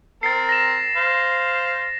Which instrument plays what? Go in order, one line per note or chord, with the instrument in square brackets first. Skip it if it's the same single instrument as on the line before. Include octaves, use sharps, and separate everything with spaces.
[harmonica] C4 A#4 [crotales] A6 C7
[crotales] A#6 E7
[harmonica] C5 F5